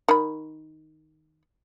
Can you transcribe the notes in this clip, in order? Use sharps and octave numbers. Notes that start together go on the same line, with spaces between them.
D#3 B5